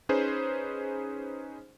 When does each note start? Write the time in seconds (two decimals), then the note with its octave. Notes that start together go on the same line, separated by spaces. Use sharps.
0.09 C#4 D#4 G#4 B4 C5